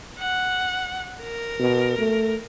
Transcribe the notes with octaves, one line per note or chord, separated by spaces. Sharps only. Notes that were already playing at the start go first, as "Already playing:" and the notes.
F#5
A#4
B2
A3